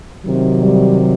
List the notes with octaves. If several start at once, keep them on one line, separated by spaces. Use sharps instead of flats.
C3 D#3 F#3
G3